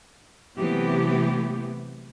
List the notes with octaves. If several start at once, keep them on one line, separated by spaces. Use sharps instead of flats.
C3 E3 F#3 A3 B3 G4